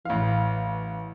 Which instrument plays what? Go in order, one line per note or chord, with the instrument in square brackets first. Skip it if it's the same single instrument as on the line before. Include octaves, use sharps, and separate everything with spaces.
[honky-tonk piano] A1 F5 [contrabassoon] E3